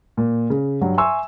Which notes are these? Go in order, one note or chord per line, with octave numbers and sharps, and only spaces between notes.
A#2
C#3
G2 F#3
E5 G#5 C6 C#6 E6